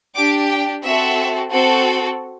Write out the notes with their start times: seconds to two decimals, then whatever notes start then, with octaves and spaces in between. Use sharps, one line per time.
0.15 D4 G4 D6
0.50 G5
0.83 C4 F#4 A4 E5
1.51 C4 F#4 A4